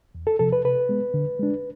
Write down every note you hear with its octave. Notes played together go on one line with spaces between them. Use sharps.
E2
A4
C3 F3 A4
B4
C3 B4
G#3 B3
D3
G#3 D4